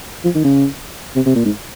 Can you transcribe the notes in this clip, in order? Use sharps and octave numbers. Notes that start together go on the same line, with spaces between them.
F3
D#3
C#3
C3
C3
A#2
G#2